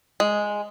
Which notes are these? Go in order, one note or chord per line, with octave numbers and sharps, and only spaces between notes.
G#3